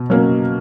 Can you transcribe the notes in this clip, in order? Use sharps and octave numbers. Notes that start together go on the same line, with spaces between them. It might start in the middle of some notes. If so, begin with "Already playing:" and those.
Already playing: B2
F#3 A#3 C#4